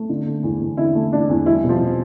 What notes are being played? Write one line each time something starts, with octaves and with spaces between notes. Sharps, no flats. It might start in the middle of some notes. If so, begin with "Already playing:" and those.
Already playing: A3
D3
A3
E2
E2
D3 E4
A3
E2 D4
E2
G3 E4
B2
F3 F4
B2